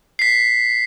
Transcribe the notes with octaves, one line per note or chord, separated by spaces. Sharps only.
B6 C7